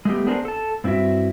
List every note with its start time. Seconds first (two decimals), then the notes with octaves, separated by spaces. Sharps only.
0.05 G#3 A3 B3 G4
0.27 B3 D4 G#4 A#4 C5
0.45 A4 A5
0.84 G2 C4 E4 F#4 E5